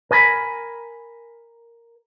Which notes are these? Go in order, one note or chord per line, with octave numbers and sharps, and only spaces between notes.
A#4 G#5 A5 B5